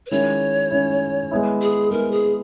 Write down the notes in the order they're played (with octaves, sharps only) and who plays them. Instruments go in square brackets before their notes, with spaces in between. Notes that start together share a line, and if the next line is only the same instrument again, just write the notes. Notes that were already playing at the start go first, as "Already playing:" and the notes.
[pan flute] B4
[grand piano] D#3 G#3 C#4 E4 [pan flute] C#5
[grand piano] D#3 G#3 C#4 E4
G#3 B3 E4
[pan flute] G#4
[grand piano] G#3 B3 E4 [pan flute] A#4
[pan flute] G#4